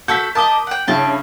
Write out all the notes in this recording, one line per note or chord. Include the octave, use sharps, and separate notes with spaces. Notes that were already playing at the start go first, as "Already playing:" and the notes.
F#4 A4 E6 G6 B6
A#4 D#5 A5 D6 D#6
F#5 G5
G2 C#3 E4 G5 A5